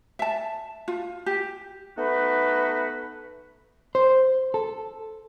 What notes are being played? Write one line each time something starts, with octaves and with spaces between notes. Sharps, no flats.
E5 A5
F4
G4
A3 B3 D#4 F#4 B4
C5
A4